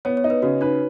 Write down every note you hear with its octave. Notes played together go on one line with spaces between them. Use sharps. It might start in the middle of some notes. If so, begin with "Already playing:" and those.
B3 C#5
C#5
D#4
B4
C#3 F#4
D#4 B4